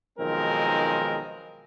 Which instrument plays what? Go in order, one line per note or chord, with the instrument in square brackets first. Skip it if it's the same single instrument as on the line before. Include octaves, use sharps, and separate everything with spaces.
[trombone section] B1 D#3 F3 G#3 C4 A#4